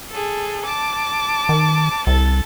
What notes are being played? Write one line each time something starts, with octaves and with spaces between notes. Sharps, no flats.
G#4 A4
A5 D6
D#3
C2 A4 A6